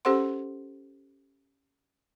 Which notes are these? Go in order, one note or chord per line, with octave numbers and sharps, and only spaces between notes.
C#4 G4 A4 C5 F#5 C6